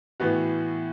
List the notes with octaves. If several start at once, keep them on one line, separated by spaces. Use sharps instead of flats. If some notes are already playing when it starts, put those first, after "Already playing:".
A2 E3 B3 F#4